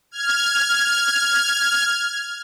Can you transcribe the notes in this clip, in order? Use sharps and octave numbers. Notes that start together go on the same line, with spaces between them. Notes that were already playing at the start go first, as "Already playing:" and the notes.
F6 G#6